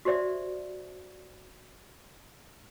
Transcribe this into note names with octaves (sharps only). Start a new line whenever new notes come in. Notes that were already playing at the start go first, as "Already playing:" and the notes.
F#4 G4 C5 D5 E5